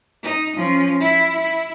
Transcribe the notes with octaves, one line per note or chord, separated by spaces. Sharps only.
D#4
F3 C#4
E4
E4